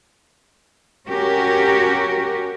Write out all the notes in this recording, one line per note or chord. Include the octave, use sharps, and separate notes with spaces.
C#4 F#4 G4 A#4